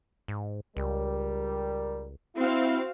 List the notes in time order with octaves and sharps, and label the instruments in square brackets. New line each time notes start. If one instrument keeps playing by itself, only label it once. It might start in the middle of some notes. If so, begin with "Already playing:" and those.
[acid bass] G#2
[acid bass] C#2 [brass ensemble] G3 A#4
[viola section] C4 F#4 F5 [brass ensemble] E4